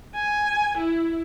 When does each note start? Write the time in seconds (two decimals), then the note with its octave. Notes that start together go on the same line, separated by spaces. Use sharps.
0.15 G#5
0.78 E4